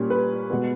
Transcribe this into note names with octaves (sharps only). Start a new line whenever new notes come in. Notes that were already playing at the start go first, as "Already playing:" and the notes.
Already playing: A#2 G3 C#4
B4
B2 G#3 B3